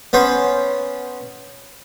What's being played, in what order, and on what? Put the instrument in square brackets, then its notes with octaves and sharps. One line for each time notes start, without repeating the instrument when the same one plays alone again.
[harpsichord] B3 C#4 C5